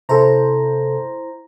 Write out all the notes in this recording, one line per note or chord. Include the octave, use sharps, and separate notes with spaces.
C3 E4 A4 C5 A#5